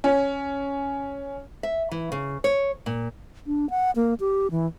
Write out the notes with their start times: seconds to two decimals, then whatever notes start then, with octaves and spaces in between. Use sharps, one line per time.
0.04 C#4
1.63 E5
1.91 E3
2.12 C#3
2.44 C#5
2.86 A#2
3.47 D4
3.70 F#5
3.96 A#3
4.20 G4
4.51 E3